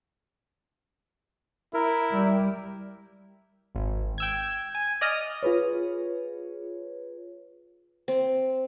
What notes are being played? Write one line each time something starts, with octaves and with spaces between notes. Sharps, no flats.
E4 A#4
G3
G#1
G5 E6 G#6
G#5
D5 D#5 D#6 F6 A#6
F4 G#4 B4 C#5
C4